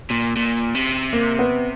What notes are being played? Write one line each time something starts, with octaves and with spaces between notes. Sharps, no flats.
A#2
A#2
C3
A#3
B3